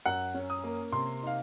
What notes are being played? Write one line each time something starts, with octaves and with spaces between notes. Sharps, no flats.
F#2 F#5
C#4
D#6
A#3
C3 C6
D#4 F5